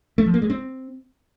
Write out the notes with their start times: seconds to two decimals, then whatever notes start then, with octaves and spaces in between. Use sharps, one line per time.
0.18 A3
0.26 F3
0.34 A#3
0.42 G#3
0.50 C4